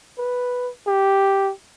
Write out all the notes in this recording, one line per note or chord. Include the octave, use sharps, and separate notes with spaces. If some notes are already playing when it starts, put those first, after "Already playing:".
B4
G4